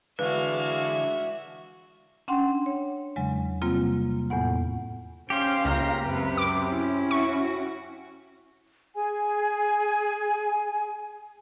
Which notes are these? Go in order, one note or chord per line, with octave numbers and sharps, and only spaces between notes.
D3 E3 G#3 F#4 B4 E5 F5
C#4 D4 F#5 G5 C6
C#5
E2 C#3 F#3 G#3
C3 G3 A#3 C4 F4
E2 A2 B3 F#5
C#4 G4 C5 F5
C#2 A#3 A#5
F#2 C3 B4
D6
C#4 E4
F#4 C#6
G#4 G#5